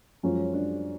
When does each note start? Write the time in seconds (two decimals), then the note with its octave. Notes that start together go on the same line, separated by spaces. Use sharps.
0.23 F#2 F3 G#3 C#4 F4
0.53 D4